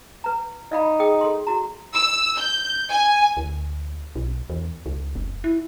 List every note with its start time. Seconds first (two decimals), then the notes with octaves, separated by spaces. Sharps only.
0.24 B4 A#5
0.72 D#4 D5 F5 B5
0.99 G#4 G5 D#6
1.21 A4 C6
1.47 F#4 A#5
1.94 E6
2.39 G6
2.89 G#5
3.37 D2
4.16 B1
4.50 E2
4.86 C#2
5.15 F#1
5.44 E4